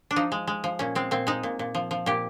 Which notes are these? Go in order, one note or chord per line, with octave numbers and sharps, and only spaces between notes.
D4
F3 D#4
G#3
G#3
F3
A#2 C#4
G#3 C4
A#2 C4
G#3 D#4
A#2
A#2
F3
F3
A#2 G4